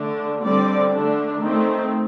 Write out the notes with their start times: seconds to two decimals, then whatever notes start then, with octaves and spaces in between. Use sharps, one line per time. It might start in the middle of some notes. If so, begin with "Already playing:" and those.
Already playing: D3 A3 D4
0.41 D3 G3 C4 D5
0.92 D3 A3 D4
1.42 D#3 A3 C4